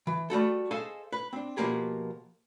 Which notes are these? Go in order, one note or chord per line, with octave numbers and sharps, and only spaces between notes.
E3
G3 A3 F#4 A4
G#4 A4 C5 D#5 F5 G#5
B4
C4 D4
B2 F3 A#3 G4 G#4